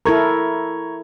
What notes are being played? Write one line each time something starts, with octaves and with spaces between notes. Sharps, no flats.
E4 A4 A#4 A#5 C#6 G#6